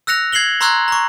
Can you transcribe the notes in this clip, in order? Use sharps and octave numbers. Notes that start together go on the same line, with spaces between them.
E6 F#6 A#6 C#7 F7
G#6 C7 C#7 F#7 G7
A#5 C6 C#6 E6 F#6 G#6
A#5 C#6